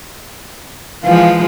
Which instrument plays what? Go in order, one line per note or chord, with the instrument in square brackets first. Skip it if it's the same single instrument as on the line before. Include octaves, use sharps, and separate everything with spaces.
[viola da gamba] E3 F3 G#3 [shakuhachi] F5